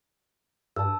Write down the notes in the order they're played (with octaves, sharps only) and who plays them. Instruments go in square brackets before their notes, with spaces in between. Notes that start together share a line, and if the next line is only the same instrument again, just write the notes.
[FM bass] G2 [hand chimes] A5 E6